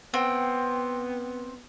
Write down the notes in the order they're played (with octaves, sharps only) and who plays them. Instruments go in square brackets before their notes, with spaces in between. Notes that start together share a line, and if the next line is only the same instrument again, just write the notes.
[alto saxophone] B3 [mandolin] C4 [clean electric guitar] F#5 G5